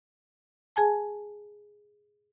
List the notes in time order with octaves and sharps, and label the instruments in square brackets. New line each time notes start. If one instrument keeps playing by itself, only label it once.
[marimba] G#4 G#5 A5